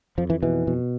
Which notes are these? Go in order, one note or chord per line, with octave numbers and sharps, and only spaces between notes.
F2 F3
E3
B2 E3
B2